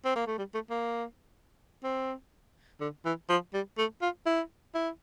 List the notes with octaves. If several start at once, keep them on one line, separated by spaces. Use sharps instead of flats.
C4
A#3
A3
G3
A3
A#3
C4
D3
E3
F3
G3
A3
F4
E4
E4